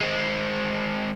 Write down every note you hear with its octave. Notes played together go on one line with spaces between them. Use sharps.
G#3 C4